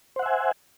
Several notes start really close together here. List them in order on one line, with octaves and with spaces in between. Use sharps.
C5 F#5 E5 G#5